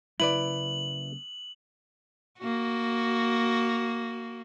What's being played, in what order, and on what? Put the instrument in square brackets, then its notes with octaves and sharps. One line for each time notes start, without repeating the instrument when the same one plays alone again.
[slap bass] C#3 F#3 A#3 [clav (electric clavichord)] E4 B4 D5 [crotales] F#7
[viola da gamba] A#3 F#4